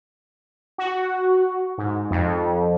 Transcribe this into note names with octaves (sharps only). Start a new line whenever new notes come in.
F#4
G#2
F2